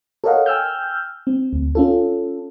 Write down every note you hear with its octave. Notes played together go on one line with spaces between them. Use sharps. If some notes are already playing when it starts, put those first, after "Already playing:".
A4 A#4 C#5 D#5 F5 F#5
G5 G#5 E6 F6 G6
C4
D2
C#4 F4 A4